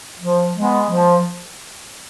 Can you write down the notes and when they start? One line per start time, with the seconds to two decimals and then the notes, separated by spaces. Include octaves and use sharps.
0.20 F3
0.55 G#3 B3
0.89 F3